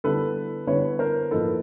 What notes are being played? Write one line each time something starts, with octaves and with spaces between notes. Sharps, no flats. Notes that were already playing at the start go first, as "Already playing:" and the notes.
D3 G3 B3 E4 A4 B4
D3 G3 B3 E4 B4 C#5
A#4 C5
A2 F3 A#3 D#4 A4 B4